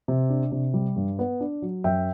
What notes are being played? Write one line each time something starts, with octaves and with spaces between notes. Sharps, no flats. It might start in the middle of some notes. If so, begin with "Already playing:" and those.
C3
D4
C3
G3
G2
B3
D4
F#3
F#2 E5 G5